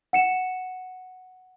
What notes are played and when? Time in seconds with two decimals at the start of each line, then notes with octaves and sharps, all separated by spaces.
0.13 F#5 C#7 E7